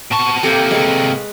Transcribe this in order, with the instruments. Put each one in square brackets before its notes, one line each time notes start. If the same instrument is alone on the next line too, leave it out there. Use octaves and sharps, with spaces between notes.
[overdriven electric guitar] B2 A5 [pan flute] C#6
[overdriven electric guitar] C3 A#3 [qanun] G4 [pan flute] A4
[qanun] G#3 B4 C#6